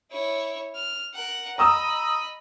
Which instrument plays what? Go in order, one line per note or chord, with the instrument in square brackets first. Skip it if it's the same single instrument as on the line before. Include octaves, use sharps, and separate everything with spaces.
[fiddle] E4 C#5
F6
A#4 F#5
[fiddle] D#5 B5 [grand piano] A#5 D#6 E6